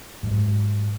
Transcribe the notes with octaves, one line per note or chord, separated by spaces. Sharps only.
G#2 F#3